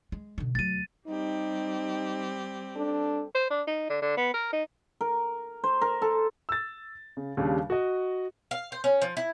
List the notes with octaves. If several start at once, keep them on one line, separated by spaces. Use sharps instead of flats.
G#3
B2 D3
D2 F#3 A6 D#7
G3 C4 D#4 G4
D4 A4
C5
D4
D#4
D3
D3
B3
A#4
D#4
A#4
C5
A#4
A4
E6 A6
C#3
D#2 C#3 G3 D4
F#4 D#5
F5
C5
C#4
F3
E4